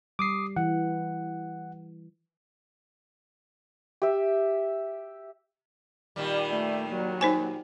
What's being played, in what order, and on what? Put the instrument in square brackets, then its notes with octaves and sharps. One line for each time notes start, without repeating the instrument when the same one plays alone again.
[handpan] G3 [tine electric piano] D6 D#6 C7
[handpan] E3 [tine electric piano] F#5
[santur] G4 E5
[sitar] A#2 D#3 G3
[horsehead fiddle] A3
F#3 A#3
[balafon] D#4 C5 G#5